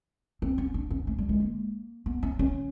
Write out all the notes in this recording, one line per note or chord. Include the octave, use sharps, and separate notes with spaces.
C4
C#4
D4
C#4
A3
G3
G#3
A#3
B3
C#4
C#4